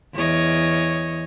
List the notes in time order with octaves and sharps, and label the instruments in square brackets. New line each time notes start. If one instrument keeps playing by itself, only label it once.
[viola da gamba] E2 C#5 D#5